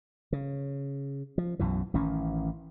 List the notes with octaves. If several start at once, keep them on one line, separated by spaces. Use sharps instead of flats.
C#3
F3
B1 F#2 B2 E3
A1 D#3 E3 C#4